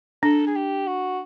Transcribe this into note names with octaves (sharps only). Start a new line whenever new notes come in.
D4 A4
G#4
G4
F#4